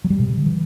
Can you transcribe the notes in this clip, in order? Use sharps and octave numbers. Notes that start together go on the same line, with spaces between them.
F#3
G3
B2
C#3
D3
E3